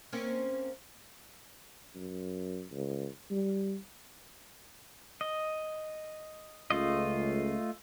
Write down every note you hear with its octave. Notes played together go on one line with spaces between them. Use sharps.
A#3 C4 C#4
F#2
C#2
G3
D#5
C#2 A3 F4 D#5